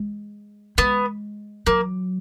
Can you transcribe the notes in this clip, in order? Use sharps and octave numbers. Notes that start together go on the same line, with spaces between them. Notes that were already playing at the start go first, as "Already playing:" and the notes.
Already playing: G#3
G#3 B3
F#3 A#3